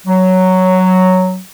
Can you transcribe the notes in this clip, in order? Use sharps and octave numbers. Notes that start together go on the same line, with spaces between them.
F#3